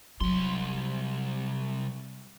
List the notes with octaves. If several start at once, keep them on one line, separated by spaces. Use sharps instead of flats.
C2 F#3 C6